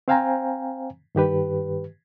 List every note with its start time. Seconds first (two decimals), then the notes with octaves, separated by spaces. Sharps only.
0.08 C4 C5 F5 G5 G#5 A#5
1.15 G2 D#3 G4 B4